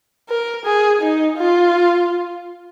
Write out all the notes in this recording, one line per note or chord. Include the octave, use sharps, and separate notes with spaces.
A#4
G#4
D#4
F4